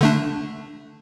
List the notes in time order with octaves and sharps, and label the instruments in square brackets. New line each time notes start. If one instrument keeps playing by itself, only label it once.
[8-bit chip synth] D3 A3 D4